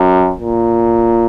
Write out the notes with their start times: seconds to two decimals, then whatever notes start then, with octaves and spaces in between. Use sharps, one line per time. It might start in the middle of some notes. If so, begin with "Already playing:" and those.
Already playing: F#2
0.39 A#2